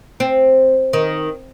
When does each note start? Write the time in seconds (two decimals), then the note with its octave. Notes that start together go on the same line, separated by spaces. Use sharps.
0.20 C4
0.93 D#3